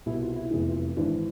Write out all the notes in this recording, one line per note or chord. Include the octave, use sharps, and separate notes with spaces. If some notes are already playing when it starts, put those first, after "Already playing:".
C2 B2 E4
F4
E4
F1 E2 C3 E3 G#4
F4
G#1 G#2 E3 D4